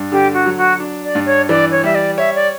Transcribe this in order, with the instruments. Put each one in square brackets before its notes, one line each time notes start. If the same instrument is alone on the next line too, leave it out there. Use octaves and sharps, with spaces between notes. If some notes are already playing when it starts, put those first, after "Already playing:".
Already playing: [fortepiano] G2
[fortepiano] D3 [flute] G4
[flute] F#4
[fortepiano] F#3
[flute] F#4
[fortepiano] D4
[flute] D5
[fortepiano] G2
[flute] C#5
[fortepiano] E3 [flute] D5
[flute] C#5
[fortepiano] G3 [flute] E5
[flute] D5
[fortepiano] C#5 [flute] E5
[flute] D5